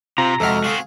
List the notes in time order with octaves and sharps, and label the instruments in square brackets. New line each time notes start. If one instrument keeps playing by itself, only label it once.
[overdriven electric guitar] C3 [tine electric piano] C4 F4 [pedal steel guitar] A#5
[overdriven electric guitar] F2 [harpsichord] C3 G#3 F#4 [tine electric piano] A4 F6
[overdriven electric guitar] C4 F#4 [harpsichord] G#4 F5